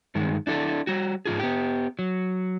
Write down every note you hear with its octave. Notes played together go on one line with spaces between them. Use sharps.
G2 D#3 G#3
D4 E4 A4
G3 F#4
G#2 D#3 F4 G#4
B3 G4
F#3